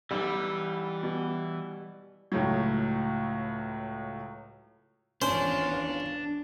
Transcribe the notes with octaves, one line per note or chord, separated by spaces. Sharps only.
B1 E3 G3
B2
C#2 A2 F#3
G#1 E2 C#4 D4 F4 C5